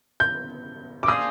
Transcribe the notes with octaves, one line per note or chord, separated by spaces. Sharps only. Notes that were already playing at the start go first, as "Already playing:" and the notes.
G6
D6
A#3 D4 F4 G#4 C5 D#6